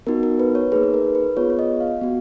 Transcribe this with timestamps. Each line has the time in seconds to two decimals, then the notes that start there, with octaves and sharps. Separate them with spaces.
0.07 B3 D#4 F#4 A#4
0.23 A#4
0.40 B4
0.55 C#5
0.72 A#3 D#4 G#4 B4
0.83 B4
0.94 A#4
1.15 B4
1.37 B3 F4 G#4 C#5
1.50 C#5
1.59 D#5
1.80 F5
2.01 B3 F#4